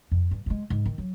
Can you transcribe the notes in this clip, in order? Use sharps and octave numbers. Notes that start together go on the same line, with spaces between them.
F2
G2
G2 G#3
G#2
D#3
F#3